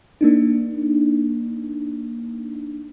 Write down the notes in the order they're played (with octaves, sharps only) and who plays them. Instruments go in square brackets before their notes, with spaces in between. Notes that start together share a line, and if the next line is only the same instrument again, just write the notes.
[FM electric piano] A#3 D4 D#4